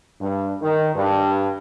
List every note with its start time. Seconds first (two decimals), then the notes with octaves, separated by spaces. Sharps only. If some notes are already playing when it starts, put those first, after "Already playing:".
0.20 G2
0.62 D#3
0.95 G2